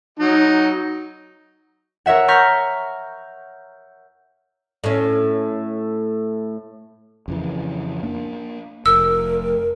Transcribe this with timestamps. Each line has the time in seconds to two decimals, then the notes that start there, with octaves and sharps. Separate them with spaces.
0.20 F#3 D#4
2.06 A#4 C#5 E5 F#5
2.28 A#5 C#6 F6 G6 A#6 B6
4.84 A2 C#4
7.28 F2 C#3 E3
8.03 A#3 D4
8.86 F1 A#4 E6